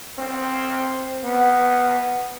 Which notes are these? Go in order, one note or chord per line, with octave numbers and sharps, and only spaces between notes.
C4
B3